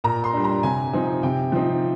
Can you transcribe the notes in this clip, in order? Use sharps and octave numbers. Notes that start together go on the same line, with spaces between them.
A#2 A#5
C6
G3 D4
A#5
C3 G#5
F3 C4 D#4
C3 G5
F3 C4 D#4